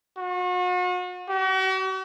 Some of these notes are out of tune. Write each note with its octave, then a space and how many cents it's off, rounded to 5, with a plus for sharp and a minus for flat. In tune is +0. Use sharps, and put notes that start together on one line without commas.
F#4 -40
F#4 +45